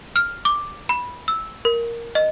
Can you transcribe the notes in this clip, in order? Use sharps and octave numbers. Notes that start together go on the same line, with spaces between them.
F6
D6
B5
E6
A#4
D#5